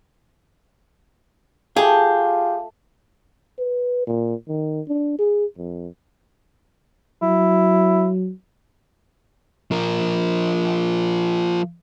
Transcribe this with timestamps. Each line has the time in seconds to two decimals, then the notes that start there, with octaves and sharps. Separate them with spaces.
1.76 A3 F4 G4 G#4
3.58 B4
4.07 A#2
4.48 D#3
4.88 D4
5.19 G#4
5.58 F2
7.22 F#3 E4
9.71 F3 A#4